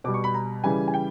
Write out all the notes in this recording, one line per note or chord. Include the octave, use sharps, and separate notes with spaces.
B2 G3 D6
C#6
B5
A#5
C#3 E3 G3 G#5
G#5
G5